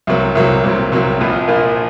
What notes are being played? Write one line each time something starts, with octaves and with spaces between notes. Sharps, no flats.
C2 C3 F#3 A#3
C2 C3 F#3 A#3
C2 C3 F#3 A#3
C2 C3 F#3 A#3
A#1 A#2 F3 A#3
A#1 A#2 F3 A#3